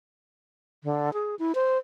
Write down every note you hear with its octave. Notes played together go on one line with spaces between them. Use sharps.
D3
G#4
E4
C5